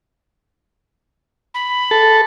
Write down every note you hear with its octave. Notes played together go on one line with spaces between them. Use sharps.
B5
A4